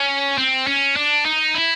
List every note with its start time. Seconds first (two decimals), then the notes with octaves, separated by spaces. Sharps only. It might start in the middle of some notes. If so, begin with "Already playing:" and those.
Already playing: C#4
0.38 C4
0.67 C#4
0.96 D4
1.25 D#4
1.54 E4